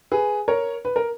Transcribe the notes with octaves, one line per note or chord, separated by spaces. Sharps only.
G#4 B4
A#4 C#5
B4
A#4